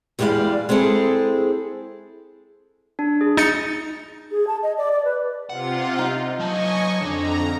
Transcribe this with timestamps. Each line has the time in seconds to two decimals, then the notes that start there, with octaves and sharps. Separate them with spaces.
0.19 E2 G3 G#3 G4 D5 F5
0.69 G#3 C4 E4 G#4 A4
2.99 D4
3.21 G#4
3.37 D#4 A6 C#7
4.31 G#4
4.47 A5
4.63 D#5
4.78 D5
4.91 D5
5.05 B4
5.49 C3 F4 F#5
5.99 D#4
6.39 F#3 D#5 G#5 A5 C#6
7.01 F2 D3 D4 A#5